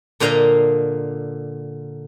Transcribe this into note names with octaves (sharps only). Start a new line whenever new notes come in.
A#2 D3 C5 D#5 F5 A#5